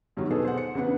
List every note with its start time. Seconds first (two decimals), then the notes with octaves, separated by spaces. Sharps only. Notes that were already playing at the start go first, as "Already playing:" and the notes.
0.17 E2 G2 D#3 F#3
0.30 B2 B3 D#4 G#4 A4
0.45 C5 F#5
0.58 C#7
0.75 E2 C#3 D4 B4 F#5